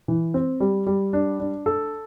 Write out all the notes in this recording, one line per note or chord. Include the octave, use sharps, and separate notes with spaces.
E3
C4
G3
G3
D4
D4
A4